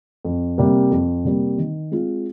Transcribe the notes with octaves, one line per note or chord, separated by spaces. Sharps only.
F2
C3 G3 A#3
F2
C3 G3 A#3
D#3
G#3 C4 F4